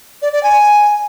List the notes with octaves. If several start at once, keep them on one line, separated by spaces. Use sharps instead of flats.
D5
D5
G#5